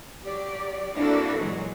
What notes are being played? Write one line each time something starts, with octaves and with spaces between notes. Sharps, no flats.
F#3 G4 D5
A#3 C4 D4 E4 F#4 A4
A#2 E3 F#3 G#3